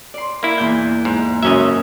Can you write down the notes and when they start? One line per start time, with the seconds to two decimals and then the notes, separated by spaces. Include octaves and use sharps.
0.14 D5 C6
0.43 A#3 E4
0.58 E2 A#2 G6
1.05 G#2
1.43 C#2 F#2 C#4 E5 D#6